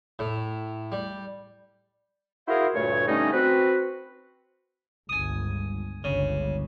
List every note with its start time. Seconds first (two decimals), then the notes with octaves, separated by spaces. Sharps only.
0.19 A2
0.92 G3
2.48 E4 F#4 G#4 A#4 C5 F5
2.75 D2 G2 A#2 A3 C#5
3.08 D3 G3 A3 C#4 D#4
3.33 C4 F#4 B4
5.09 G1 C#2 G#5 D#6
6.04 G1 C#2 C#3